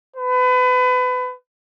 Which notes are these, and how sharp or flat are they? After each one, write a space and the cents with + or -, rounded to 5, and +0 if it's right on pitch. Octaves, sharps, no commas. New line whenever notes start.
B4 +30